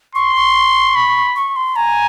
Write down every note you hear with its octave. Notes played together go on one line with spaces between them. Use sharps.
C6 C#6
C#6
B5
C#6
C6
G#5 A#5